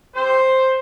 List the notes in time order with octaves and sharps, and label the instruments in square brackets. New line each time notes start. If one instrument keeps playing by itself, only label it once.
[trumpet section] C4 G4 C5